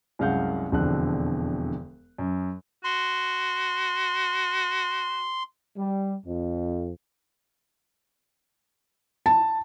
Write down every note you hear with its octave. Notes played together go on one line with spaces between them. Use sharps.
C2 F#2 G#3 F5 F#5 G6
E1 F2 B2 D3 F#6
F#2
F#4 C6
G3
F2
A5